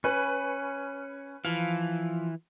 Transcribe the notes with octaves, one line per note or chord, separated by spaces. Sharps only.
C#4 B4
E3 F3 F5